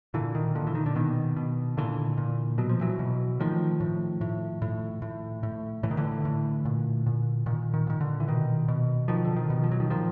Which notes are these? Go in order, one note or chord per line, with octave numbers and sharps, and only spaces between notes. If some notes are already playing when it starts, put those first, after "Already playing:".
A#2 D3 E3
D#3
A#2 D3
E3
D#3
D3
B2 D#3
B2
A#2 D3 E3
A#2
B2 F#3
F3
E3 F#3
B2
A2 D#3 F3
A2
A2
A2
A2
A2
A2 E3
D#3
D3 E3
A2
A#2
A#2
A#2 D#3
D#3
A#2 D#3
D3
E3
B2 D#3
B2
B2 D#3 F3
D3
D#3
B2
F3
F#3
D#3 F3
A#2 D#3 F3